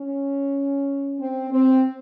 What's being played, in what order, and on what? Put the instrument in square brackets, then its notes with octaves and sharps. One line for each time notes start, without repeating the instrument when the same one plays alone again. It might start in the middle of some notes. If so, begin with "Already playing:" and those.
Already playing: [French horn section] C#4
C4
C4